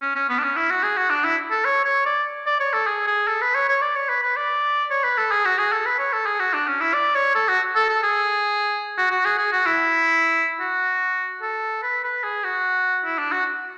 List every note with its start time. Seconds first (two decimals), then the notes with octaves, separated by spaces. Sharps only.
0.02 C#4
0.16 C#4
0.29 B3
0.38 D4
0.43 C#4
0.56 E4
0.70 F#4
0.83 G#4
0.97 F#4
1.10 D4
1.24 E4
1.51 A4
1.65 C#5
1.85 C#5
2.06 D5
2.46 D5
2.60 C#5
2.73 A4
2.87 G#4
3.07 G#4
3.28 A4
3.42 B4
3.55 C#5
3.68 C#5
3.82 D5
3.96 C#5
4.09 B4
4.23 B4
4.37 D5
4.91 C#5
5.04 B4
5.18 A4
5.32 G#4
5.45 F#4
5.58 G#4
5.72 A4
5.86 B4
5.99 C#5
6.13 A4
6.26 G#4
6.40 F#4
6.54 D4
6.67 C#4
6.81 E4
6.94 D5
7.15 C#5
7.35 A4
7.49 F#4
7.76 A4
7.89 A4
8.03 G#4
8.98 F#4
9.11 F#4
9.25 G#4
9.38 G#4
9.52 F#4
9.66 E4
10.61 F#4
11.42 A4
11.83 B4
12.04 B4
12.24 G#4
12.44 F#4
13.05 E4
13.18 D4
13.32 F#4